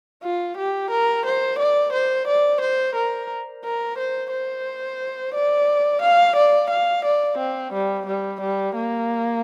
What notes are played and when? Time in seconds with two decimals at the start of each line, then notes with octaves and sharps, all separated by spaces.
0.23 F4
0.57 G4
0.91 A#4
1.26 C5
1.59 D5
1.93 C5
2.28 D5
2.61 C5
2.96 A#4
3.64 A#4
3.98 C5
4.31 C5
5.35 D5
6.02 F5
6.36 D5
6.71 F5
7.05 D5
7.38 C4
7.73 G3
8.06 G3
8.41 G3
8.75 A#3